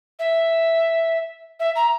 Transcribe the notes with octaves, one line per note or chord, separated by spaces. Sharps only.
E5
E5
A#5